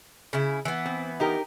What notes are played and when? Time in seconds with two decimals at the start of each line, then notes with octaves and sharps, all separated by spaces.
0.33 C#3 E4
0.65 E3 B3
0.86 C4
1.20 D#4 G4 A#4